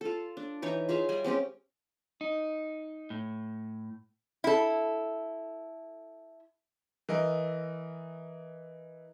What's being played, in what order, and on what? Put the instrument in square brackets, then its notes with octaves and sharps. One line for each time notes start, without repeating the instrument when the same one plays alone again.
[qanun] F4 A4
D4
E3 D#4 C#5 C#6
F4 G#4 E5 F5
G3 D#5 G#5
G#3 C4 C#4 G4
[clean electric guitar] D#4
A2
[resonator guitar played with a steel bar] E4 A4
[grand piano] E3 A#4 D#5